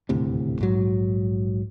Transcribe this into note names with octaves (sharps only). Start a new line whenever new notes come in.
D#1 D2 A2 C3
A#1 G#2 F#3